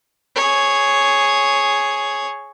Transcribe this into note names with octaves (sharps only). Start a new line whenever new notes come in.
G#4 C#5